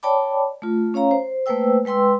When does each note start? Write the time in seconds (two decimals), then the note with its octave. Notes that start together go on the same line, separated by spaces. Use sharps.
0.03 C#5 D5 G5 A5 B5 D6
0.62 A3 F4
0.94 C#4 C#5 F5 A#5
1.11 C5
1.46 A3 A#3 B4 C5 G5 E6
1.85 G#3 B4 G5 C6 E6